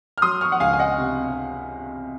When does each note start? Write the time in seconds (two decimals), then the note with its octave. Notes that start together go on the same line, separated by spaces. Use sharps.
0.18 F6
0.22 F#3 C6 D#6
0.41 C#6 F6
0.52 F#5
0.60 C#2 F5 G#5
0.73 G#5
0.79 D#5 F#5
0.98 C3